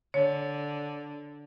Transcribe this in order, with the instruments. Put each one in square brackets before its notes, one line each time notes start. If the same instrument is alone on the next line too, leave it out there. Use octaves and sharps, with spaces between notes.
[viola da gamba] D3 [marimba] C#5